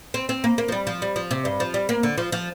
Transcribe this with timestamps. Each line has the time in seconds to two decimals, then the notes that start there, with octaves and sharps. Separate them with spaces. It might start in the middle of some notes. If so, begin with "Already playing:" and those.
0.14 C4
0.29 C4
0.44 A#3
0.58 A#3
0.68 F3
0.72 G3
0.87 F3
1.02 G3
1.16 F3
1.31 C3
1.45 G2
1.60 F3
1.74 G3
1.89 A#3
2.03 D3
2.18 F3
2.32 F3